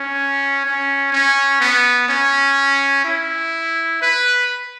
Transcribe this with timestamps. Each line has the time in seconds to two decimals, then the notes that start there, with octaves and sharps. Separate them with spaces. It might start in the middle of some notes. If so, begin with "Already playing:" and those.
Already playing: C#4
0.65 C#4
1.13 C#4
1.61 B3
2.09 C#4
3.05 E4
4.02 B4